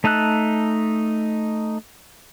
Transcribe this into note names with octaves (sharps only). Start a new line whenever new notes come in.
A3 D#4 A5 E6 F#6